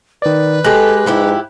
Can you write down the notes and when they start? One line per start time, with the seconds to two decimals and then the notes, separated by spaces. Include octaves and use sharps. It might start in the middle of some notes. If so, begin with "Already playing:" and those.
0.22 D#3 B4 D5
0.64 G#3 G4 A4 F#6
1.06 G#2 F3 E4 G4